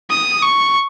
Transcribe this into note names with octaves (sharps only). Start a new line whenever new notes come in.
D#6
C#6